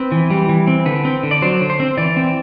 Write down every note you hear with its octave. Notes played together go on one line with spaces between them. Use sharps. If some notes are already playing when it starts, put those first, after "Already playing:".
Already playing: C4 B4
E3
G3
E3
C4
D3 B4
C4
D3
D5
F#3 C5
D3
C5
C4
E3 D5
C4